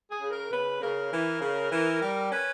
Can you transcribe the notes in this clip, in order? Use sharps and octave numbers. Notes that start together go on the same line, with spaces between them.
G#4
C#3
A#4
C#3 B4
C#3 A#4
E3
C#3
E3
G3
C#4 B4